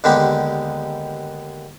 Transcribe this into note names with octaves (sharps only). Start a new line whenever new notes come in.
D#2 D3 D#3 G#3 B3 G4